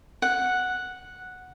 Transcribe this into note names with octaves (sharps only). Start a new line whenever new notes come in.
F#5